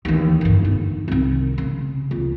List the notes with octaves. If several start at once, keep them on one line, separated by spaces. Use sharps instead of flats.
D#2 E3
G2 D3
D#4
C2 D#3
C#3
C#2